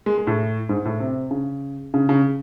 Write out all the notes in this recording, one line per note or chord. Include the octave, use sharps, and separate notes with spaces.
G#3
G#3
A2
G#2
A2
C3
C#3
C#3
C#3